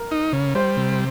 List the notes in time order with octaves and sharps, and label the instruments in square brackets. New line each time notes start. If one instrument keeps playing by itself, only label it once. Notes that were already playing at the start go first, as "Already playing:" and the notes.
Already playing: [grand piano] A#4
[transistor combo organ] D#4
C#3
[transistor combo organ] G3 [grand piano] C5
[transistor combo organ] C3